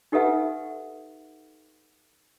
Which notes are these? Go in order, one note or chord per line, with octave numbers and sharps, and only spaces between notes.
D#4 G4 A4 B4 E5 F#5